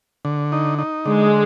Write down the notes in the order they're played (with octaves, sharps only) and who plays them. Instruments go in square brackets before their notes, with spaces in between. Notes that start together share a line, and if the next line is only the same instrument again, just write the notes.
[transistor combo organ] D3
D#4
D#4
[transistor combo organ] D3 [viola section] G#3